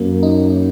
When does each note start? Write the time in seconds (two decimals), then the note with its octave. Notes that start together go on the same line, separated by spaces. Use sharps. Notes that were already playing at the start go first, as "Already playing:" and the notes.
Already playing: F#2 A#3
0.23 D#4